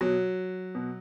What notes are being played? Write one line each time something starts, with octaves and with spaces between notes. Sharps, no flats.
B2 F#3
B2